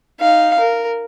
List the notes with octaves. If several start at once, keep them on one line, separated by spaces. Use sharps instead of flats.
D#4 F5
A#4